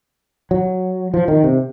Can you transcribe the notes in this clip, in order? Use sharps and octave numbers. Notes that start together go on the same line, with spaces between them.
F#3
F3
D#3
C3